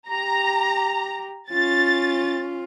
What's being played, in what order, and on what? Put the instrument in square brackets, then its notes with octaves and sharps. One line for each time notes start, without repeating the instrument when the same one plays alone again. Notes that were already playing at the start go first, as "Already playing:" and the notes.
[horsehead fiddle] G4 [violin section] A#5
[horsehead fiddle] C#4 F4 [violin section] A6